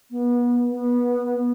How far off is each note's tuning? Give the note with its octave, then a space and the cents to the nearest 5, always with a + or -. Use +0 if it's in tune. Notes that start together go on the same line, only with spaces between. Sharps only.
B3 -30
B3 -20